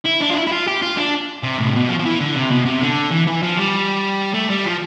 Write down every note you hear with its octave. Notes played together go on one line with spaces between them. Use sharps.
E4
D4
F4
E4
E4
F4
G4
F4
D4
C3
A2
C3
B2
F3
F3
E3
D3
C3
B2
C3
D3
E3
E3
F3
G3
A3
G3
F3